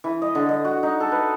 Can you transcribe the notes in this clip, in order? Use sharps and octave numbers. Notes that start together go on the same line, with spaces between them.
E3
D#5
D3
D#5
F#4
D#4
A4
B4